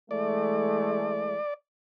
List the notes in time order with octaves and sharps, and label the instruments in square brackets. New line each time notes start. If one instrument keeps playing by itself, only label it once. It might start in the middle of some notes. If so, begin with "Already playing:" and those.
[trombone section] E3 G#3 A3 [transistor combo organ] D5